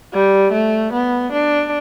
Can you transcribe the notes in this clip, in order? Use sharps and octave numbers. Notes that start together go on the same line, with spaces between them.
G3
A3
B3
D4